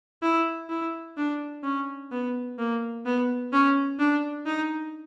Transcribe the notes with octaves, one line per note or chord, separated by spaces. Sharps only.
E4
E4
D4
C#4
B3
A#3
B3
C#4
D4
D#4